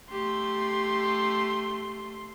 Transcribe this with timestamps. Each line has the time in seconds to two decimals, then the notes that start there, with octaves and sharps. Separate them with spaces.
0.11 A3 G4 C6